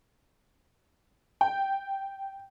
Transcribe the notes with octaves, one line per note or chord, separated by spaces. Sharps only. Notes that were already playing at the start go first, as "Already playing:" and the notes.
G5